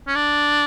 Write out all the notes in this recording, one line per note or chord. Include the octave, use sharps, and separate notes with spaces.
C#4
D4